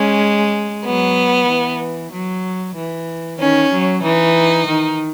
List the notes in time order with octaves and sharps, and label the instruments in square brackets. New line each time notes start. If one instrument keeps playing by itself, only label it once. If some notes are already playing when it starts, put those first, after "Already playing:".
Already playing: [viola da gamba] G#3 [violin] C#4
[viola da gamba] F#3 [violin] B3
[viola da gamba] E3
F#3
E3
[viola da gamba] D#3 [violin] C#4
[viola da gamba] F#3
[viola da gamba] E3 [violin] D#4
[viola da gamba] D#3